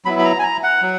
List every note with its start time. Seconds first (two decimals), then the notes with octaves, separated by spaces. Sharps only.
0.05 F#3 B3 E4 B5
0.19 B5
0.25 A#5
0.39 G#5
0.44 A#5
0.63 F#5
0.83 F#3